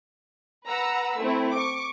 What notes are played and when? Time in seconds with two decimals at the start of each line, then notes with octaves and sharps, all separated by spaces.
0.68 B4 F#5 A#5 E6
1.19 A3 C4 E4
1.52 C#6 D6